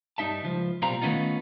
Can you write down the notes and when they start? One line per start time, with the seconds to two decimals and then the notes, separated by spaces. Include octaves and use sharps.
0.18 G2 G3 D#4 E5 A5
0.43 C#2 F3
0.82 B1 A#2 G3 C4 F4 A#5
1.02 D#3 A3 B3 C#4 D#4 F4